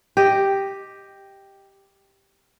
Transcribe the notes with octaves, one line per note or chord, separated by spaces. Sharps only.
G4 D#5